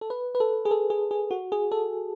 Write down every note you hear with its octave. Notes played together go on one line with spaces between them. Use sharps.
A4
B4
B4
A4
G#4
A4
G#4
G#4
F#4
G#4
A4